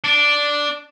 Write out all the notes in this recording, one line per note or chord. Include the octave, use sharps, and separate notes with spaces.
D4